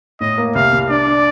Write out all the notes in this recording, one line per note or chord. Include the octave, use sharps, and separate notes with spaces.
A2 D#5
A#3
C2 F5
C2
D4 D5
D4